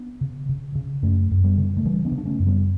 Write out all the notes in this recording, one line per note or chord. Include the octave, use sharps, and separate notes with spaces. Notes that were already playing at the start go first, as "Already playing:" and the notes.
Already playing: B3 D4
C#3
C#3
C#3
F#2 A3 C#4
F#2
G3 B3
C#3
A3
C#3 E3 G3
B3 D4
C#3
D4
A3 C#4
F#2
G3 B3